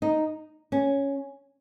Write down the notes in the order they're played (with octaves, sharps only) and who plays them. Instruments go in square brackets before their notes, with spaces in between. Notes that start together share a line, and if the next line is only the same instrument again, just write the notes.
[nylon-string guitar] D#4
C#4